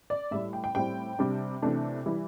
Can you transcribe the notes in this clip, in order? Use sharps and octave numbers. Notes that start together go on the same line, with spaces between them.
D5
A2 G3 E4 E5
G5
G5
A2 G3 C4 E4 G5
C3 G3 D4
C3 E3 A3 D4
E3 G3 E4